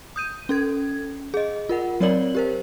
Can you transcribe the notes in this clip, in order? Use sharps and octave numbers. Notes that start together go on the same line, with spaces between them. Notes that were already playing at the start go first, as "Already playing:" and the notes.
D#6 G6 D#7
C#4 A4 G#6
G#4 D#5
F4 A#4 F#5
F#3 C4 A#4 C#5 D5 F#7
G4 A#4 C5